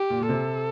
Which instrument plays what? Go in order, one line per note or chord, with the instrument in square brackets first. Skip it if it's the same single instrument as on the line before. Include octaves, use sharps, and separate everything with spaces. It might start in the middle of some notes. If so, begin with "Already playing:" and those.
Already playing: [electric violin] G4
[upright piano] A#2
A#2
[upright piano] C3 [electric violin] A4